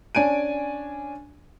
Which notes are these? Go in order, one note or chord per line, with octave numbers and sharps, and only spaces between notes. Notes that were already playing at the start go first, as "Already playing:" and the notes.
C#4 D4 G#5 D7 D#7